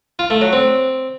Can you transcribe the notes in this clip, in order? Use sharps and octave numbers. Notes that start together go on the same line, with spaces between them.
F4
A3
F#3
C4